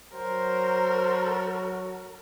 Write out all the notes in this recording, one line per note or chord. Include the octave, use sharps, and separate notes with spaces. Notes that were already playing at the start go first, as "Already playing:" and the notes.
F#3 A#4 C5